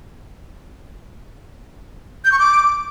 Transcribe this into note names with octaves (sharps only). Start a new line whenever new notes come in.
G6
C#6
D6